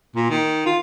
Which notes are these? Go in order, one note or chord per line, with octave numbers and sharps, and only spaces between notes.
A#2
D#3
F4